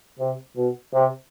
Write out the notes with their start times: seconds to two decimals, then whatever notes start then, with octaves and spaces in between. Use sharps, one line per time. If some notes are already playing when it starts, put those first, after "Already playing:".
0.19 C3
0.56 B2
0.93 C3